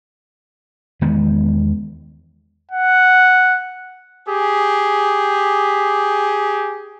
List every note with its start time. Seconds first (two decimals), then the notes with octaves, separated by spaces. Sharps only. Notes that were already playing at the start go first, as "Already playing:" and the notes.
1.01 E2 D#3 G#3 B3
2.71 F#5
4.29 G4 G#4